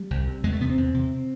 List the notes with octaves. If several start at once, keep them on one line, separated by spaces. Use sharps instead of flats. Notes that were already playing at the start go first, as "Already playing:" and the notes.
Already playing: G3
C2
C3
E2 G#3
A3
C3 B3
C4
E2
C3